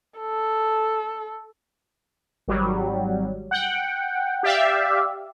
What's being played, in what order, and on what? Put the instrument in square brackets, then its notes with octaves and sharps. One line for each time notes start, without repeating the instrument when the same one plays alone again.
[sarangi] A4
[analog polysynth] G#1 F#3 G3
F#5 G5
G4 D5 E5 F5